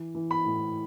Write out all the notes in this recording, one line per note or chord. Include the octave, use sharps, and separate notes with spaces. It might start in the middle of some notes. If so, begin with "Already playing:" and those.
Already playing: E3
E3
B5
A2